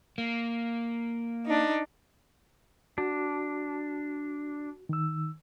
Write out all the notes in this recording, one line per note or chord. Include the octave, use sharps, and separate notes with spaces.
A#3
D4 D#4
D4 F#4
D#3 E6